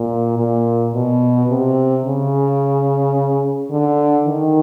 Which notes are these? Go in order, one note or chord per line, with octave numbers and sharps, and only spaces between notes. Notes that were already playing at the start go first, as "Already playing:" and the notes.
Already playing: A#2
A#2
B2
C3
C#3
D3
D#3